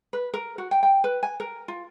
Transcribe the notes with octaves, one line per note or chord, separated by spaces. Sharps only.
B4
A#4
F#4
G5
G5
B4
G#5
A#4
F4